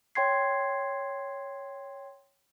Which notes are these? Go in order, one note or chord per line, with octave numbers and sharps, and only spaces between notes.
C#5 G5 C6 G#6 C7